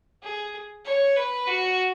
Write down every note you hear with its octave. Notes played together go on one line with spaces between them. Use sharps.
G#4
C#5
B4
F#4